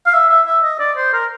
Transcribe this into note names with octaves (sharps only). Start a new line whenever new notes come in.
F5
E5
E5
E5
D#5
D5
C5
A#4